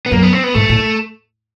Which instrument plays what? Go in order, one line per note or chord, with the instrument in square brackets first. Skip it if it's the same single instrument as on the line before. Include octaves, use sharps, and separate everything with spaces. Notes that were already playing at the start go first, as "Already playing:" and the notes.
[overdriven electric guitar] B3
[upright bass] F#2 [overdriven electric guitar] A#3
[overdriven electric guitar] B3
C4
B3
[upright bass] G#2 [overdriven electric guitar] A3
[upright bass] A2